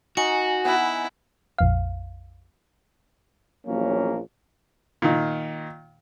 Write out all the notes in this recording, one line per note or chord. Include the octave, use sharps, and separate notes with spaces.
D#4 F#4 G#5
B3 E4 F#5
A#1 F2 F5
A#1 E2 F#3 A#3 C#4
A#2 D#3